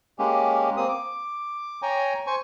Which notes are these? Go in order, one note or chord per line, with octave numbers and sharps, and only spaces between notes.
G#3 A#3 C#4 G4
A#3 C4 D#6
D6
C#5 G5 G#5 A#5
C5 G#5 C#6